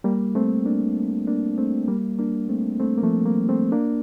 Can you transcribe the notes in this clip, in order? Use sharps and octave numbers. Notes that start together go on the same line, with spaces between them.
G3 A#3
A3 C4
A#3 D4
A#3 D4
A3 C4
G3 A#3
A#3 D4
A3 C4
A3 C4
A#3
F3 A3
G3 A#3
A3 C4
A#3 D4